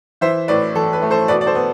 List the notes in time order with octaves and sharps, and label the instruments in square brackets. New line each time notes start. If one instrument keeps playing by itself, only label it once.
[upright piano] E3 C5 E5
A2 B4 D5
E3 A4
B4
A3
A4 C5
B2 B4 D5
D5
A4 C5
B3